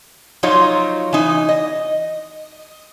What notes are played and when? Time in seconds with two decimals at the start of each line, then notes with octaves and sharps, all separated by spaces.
0.43 F3 F#3 D#4 F4 C#5
1.13 E3 D#4
1.49 D#5